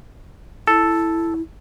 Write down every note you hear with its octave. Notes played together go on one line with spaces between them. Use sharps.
E4 A4